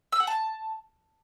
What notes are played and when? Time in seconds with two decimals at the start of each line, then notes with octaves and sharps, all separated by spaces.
0.12 E6
0.20 F#5
0.27 A5